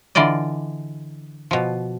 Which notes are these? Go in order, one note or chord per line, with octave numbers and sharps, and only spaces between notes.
D3 E3 F4 D5 D#5
B2 F3